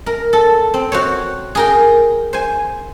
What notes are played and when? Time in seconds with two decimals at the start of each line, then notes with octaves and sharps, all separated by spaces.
0.06 A#4
0.33 A4
0.74 C4
0.92 F#4 C5 C#5
1.55 G#4 A#4 G5
2.33 C5 G#5